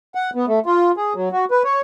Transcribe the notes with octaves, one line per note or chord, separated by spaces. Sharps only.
F#5
B3
A3
F4
G#4
F#3
F#4
B4
C#5